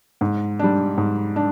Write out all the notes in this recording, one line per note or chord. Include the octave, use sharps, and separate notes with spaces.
G#2
G3 D4
G#2
D4